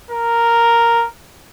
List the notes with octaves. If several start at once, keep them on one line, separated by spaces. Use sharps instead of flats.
A#4